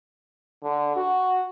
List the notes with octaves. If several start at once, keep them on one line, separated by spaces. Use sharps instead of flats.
D3
F#4